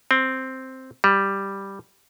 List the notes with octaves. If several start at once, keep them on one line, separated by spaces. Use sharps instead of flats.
C4
G3